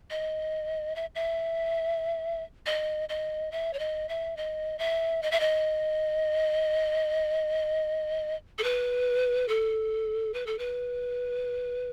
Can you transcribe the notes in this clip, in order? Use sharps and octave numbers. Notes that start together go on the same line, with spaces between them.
D#5
E5
E5
D#5
D#5
E5
C#5
D#5
E5
D#5
E5
D#5
E5
D#5
A4
B4
A4
B4
A4
B4